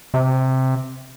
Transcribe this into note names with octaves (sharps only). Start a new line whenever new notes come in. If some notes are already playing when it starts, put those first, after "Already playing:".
C3